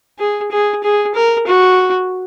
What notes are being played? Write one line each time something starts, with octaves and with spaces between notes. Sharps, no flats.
G#4
G#4
G#4
A#4
F#4